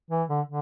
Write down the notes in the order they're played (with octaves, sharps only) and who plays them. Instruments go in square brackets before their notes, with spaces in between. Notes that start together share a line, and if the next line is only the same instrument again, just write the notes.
[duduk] E3
D3
D3